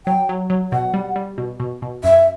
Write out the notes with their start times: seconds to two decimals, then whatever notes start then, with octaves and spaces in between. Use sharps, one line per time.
0.06 F#3 G5
0.29 F#3
0.50 F#3
0.72 B2 F#5
0.94 G3
1.16 G3
1.38 B2
1.60 B2
1.82 B2
2.04 F#2 E5